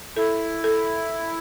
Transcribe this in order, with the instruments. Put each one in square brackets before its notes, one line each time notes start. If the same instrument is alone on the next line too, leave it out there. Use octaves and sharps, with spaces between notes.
[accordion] E4 [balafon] A4
[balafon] A4